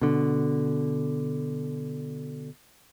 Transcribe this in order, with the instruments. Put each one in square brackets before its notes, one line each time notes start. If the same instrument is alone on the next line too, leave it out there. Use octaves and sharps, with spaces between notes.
[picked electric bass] B2 D3